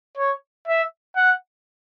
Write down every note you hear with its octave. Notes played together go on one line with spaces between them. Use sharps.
C#5
E5
F#5